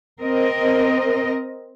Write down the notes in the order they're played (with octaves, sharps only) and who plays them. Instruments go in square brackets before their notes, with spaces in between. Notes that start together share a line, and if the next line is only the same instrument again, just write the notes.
[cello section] C4 A#4 D#5